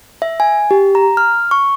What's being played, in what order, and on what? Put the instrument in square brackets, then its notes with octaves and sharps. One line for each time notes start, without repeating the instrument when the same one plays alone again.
[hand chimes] E5
G#5
G4
A#5
F6
C#6